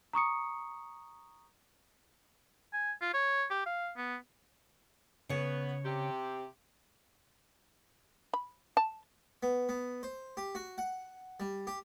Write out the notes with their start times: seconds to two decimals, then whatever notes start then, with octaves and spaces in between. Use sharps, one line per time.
0.13 A#5 C#6 D#6 C#7
2.73 G#5
3.02 F4
3.14 C#5
3.51 G4
3.66 F5
3.97 B3
5.29 C#3 B3 C#5
5.84 C3 G4
8.34 B5
8.77 A5
9.43 B3
9.69 B3
10.03 C5
10.37 G4
10.55 F#4
10.78 F#5
11.40 G3
11.67 G4